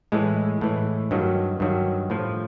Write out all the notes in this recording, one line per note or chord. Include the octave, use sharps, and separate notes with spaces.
A2 E3 G#3
A2 E3
G2 D#3 F#3
G2 D#3 F#3
A2 F3